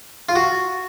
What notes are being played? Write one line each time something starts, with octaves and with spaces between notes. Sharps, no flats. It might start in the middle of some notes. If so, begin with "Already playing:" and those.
F4
F#4